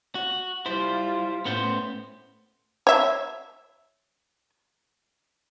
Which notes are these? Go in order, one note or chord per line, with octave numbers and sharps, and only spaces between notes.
F#4
G3 E4 F4 C5
A2 B3 C#4 C5
C#5 E5